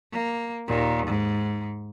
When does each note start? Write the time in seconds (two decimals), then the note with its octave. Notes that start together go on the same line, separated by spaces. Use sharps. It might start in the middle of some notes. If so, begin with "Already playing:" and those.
0.13 A#3
0.67 D#2 A#2
1.07 G#2